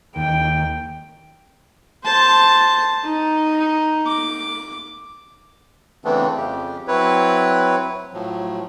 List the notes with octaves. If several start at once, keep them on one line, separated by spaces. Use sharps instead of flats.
D#2 G5
C5 A5
D#4
D6
C#3 E3 A3 B3 C4 D4
F2 C#3 G4
F#3 C4 E4 B4 C#5
A2 F3 F#3